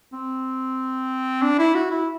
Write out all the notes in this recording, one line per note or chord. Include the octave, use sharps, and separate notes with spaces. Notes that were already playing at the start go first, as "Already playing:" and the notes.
C4
D4
E4
F#4
E4